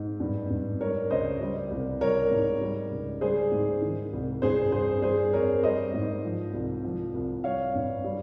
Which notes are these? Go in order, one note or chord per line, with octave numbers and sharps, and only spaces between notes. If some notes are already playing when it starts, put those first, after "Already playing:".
Already playing: G#2
G2
G2
G3 A#4 C#5
C#2 C5 D#5
G3
C2
G3 A#4 C#5
G#2
G3
C#2
G3 G#4 C5
G#2
D#3
C2
G2 G#4 C5
G2 G#4 C5
G3 G#4 C5
F2 A#4 C#5
G3 C5 D#5
G#2
F3
C2
F3
C2
G3 C#5 F5
G2
G3